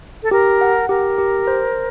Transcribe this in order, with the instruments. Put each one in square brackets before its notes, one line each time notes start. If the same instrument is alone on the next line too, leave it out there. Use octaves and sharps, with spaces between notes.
[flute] A4
[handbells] G4 [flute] A#4
[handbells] F#5
[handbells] G4 [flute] A#4
[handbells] G4
C5